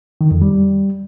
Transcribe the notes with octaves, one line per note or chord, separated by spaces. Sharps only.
D#3
F2
G3